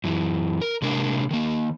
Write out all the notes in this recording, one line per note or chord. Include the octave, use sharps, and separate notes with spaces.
F#2 E3
A#4
C3 G#3 A#3 D4 A#4
D#3 A#3